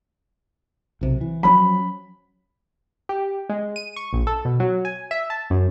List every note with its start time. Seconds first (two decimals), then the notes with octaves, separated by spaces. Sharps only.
1.01 B1 C3
1.21 E3
1.43 F3 F#3 C#4 B5
3.09 G4
3.49 G#3
3.76 D#7
3.96 C#6
4.13 A#1
4.27 A4
4.45 B2
4.60 F#3
4.85 G#5
5.11 E5
5.30 A5
5.50 F#2